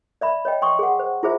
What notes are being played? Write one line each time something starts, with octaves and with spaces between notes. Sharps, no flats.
D5 E5 B5
C#5 D#5 G5
G5 C6 C#6 D#6
G#4 F#5
C5
E4 F4 G#4 C5 E5